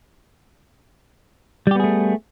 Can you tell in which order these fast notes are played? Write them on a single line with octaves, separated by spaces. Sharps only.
G3 G4 B3 G#4 A3